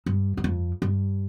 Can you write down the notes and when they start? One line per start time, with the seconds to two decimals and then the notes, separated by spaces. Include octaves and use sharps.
0.06 G2
0.37 E2
0.44 F2
0.82 G2